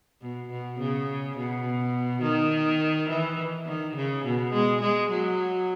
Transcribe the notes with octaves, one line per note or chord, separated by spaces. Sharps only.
B2
B2
C#3
B2
D#3
E3
D#3
C#3
B2
G#3
G#3
F#3